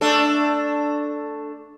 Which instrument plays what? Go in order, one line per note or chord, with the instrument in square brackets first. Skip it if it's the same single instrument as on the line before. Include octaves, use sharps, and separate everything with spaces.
[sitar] A3 D4 A4